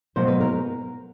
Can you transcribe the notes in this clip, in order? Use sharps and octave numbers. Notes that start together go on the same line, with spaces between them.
B2 F#3 A#3 C5
B4
A#4